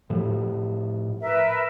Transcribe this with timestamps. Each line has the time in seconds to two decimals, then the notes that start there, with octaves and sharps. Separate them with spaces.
0.10 A2 F3
1.20 A#4 B4 E5